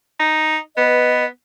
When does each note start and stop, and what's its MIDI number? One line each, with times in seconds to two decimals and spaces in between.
0.20 0.58 63
0.77 1.26 59
0.77 1.24 71
0.77 1.24 75